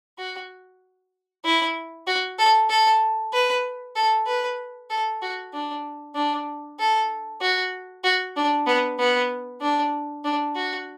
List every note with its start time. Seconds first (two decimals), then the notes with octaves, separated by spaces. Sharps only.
0.19 F#4
1.45 E4
2.07 F#4
2.39 A4
2.70 A4
3.33 B4
3.96 A4
4.27 B4
4.90 A4
5.22 F#4
5.54 D4
6.15 D4
6.79 A4
7.41 F#4
8.04 F#4
8.36 D4
8.67 B3
8.99 B3
9.61 D4
10.24 D4
10.55 F#4